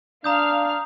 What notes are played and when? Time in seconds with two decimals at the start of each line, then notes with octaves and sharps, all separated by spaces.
0.24 D4 F5 A#5 D#6 F6 G6